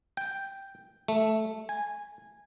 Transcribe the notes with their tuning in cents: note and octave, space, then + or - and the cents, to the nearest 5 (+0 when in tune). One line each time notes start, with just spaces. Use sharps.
G5 +0
A3 -5
G#5 -10